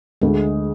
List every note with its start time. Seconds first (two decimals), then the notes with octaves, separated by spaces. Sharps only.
0.22 D2 G#3